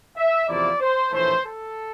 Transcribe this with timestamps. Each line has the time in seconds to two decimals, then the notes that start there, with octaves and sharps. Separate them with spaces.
0.17 E5
0.48 E2 C3 F3 A#3 E4 D5
0.79 C5
1.11 A#1 A2 E3 A3 C5
1.44 A4